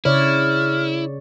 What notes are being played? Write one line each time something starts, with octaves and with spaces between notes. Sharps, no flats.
C#3 E4 C#5 D5 F6